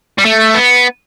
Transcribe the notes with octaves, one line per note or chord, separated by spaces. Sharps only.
G3
A3
B3